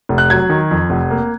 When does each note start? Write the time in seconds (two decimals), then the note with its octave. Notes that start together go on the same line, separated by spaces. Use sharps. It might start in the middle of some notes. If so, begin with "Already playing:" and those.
0.09 F1
0.18 F#6
0.30 F#3 G#6
0.50 D#3
0.71 F2
0.90 F1
1.11 A#3